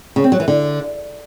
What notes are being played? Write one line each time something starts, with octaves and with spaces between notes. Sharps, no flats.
C#3
C4
F#3
E3
D3